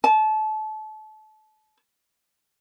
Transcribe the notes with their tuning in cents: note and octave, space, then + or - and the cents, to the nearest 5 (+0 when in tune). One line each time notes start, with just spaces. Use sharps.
A5 -30